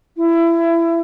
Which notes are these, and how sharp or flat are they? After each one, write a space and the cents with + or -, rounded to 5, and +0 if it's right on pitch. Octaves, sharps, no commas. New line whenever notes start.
E4 +20